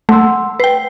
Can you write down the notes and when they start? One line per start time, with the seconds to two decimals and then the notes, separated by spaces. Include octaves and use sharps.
0.09 A3 F#5 C6 E6
0.60 B4 G5 C7